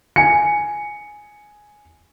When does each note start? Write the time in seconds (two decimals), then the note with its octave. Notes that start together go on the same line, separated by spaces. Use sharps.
0.16 G#5 C#7